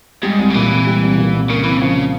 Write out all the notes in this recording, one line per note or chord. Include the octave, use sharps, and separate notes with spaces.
G#2 G3
C2
C#3
A#2 E3
C2
G3
C2
A#2
C2
C#3 A#3
C3 E3
C#3 F3
F4